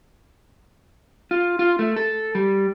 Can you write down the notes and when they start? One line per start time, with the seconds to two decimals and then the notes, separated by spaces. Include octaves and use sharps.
1.31 F4
1.59 F4
1.79 A3
1.96 A4
2.35 G3